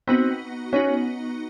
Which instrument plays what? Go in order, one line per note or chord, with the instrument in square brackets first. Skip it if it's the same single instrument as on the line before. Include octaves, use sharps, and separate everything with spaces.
[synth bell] B3 D#4 F#4 [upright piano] C4
[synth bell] B3 D#4 F#4 [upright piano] C#4